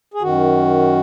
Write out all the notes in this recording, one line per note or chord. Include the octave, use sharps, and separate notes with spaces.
G#4
F#2 D#3 F#4